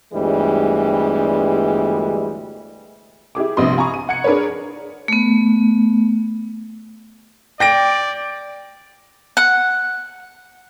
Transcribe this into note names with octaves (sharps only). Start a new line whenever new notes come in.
G1 D2 E3 G3 G#3
E4 G4 G#4 D6
A#1 G2 C3 B3 C6 D#6
F5 G#5 A#5 B5 C#6 D#6
D#7
F#5 G#6 C#7
D4 G#4 A#4 B4 C#5
A3 B3
D5 G5 A#6 D7
F#5